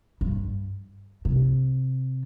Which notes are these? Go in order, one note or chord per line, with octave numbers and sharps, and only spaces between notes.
G2
C3